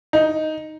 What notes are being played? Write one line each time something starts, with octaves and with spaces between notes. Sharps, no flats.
D#4